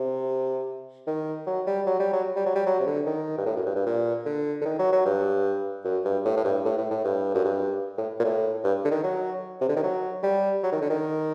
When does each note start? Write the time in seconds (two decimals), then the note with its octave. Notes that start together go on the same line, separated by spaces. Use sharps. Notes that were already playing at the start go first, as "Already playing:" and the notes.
Already playing: C3
1.07 D#3
1.47 F#3
1.67 G3
1.87 F#3
2.00 G3
2.13 F#3
2.36 G3
2.46 F#3
2.55 G3
2.66 F#3
2.80 C3
2.86 D3
3.06 D#3
3.38 G2
3.46 A2
3.56 F#2
3.66 G2
3.76 G2
3.86 A#2
4.25 D3
4.62 D3
4.65 D#3
4.79 F#3
4.92 F#3
5.06 G2
5.85 F#2
6.05 G2
6.25 A2
6.37 A2
6.45 G2
6.65 A2
6.78 A2
6.91 A2
7.05 G2
7.34 F#2
7.45 G2
7.98 A2
8.20 A#2
8.24 A2
8.64 G2
8.85 D3
8.91 D#3
9.04 F#3
9.61 C3
9.69 D3
9.76 D#3
9.83 F#3
10.23 G3
10.63 F#3
10.72 D#3
10.81 D3
10.90 D#3